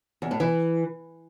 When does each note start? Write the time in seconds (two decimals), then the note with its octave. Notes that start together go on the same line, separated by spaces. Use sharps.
0.22 E2
0.31 A2
0.40 E3